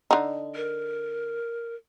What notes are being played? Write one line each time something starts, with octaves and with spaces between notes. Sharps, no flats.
D3 D#4
A#4